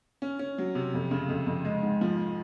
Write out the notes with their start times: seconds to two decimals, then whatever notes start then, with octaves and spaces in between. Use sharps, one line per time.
0.22 C#4
0.39 C#4
0.58 F#3
0.75 C3
0.94 F2
1.11 C#3
1.29 F2
1.47 F2
1.65 G#3
1.82 G#2
2.01 F3